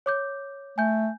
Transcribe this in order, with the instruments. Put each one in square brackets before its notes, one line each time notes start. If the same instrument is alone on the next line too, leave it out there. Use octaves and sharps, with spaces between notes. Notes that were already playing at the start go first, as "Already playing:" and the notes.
[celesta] C#5 D6 G6
[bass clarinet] A3 [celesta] G#5 G6